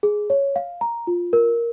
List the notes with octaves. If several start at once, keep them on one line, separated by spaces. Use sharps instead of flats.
G#4
C#5
F5
A#5
F4
A#4